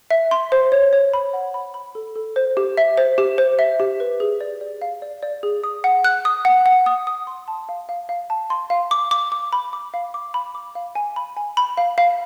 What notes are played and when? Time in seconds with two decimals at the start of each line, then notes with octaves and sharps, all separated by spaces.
0.11 E5
0.31 C6
0.52 C5
0.72 C#5
0.93 C#5
1.14 B5
1.33 F#5
1.54 B5
1.74 B5
1.95 A4
2.15 A4
2.36 C5
2.57 G4
2.77 E5
2.97 C5
3.18 G4
3.38 C5
3.59 E5
3.80 G4
4.00 B4
4.20 G#4
4.41 D5
4.61 D5
4.82 F5
5.02 D5
5.22 D5
5.43 G#4
5.64 D#6
5.84 F#5
6.05 F#6
6.25 D#6
6.45 F#5
6.66 F#5
6.86 D#6
7.07 D#6
7.27 C6
7.48 A5
7.69 F5
7.89 F5
8.09 F5
8.30 A5
8.50 C6
8.70 F5
8.91 D6
9.11 D6
9.32 D6
9.53 B5
9.73 D6
9.94 F5
10.14 D6
10.34 B5
10.55 D6
10.75 F5
10.95 G#5
11.16 B5
11.37 G#5
11.57 B5
11.78 F5
11.98 F5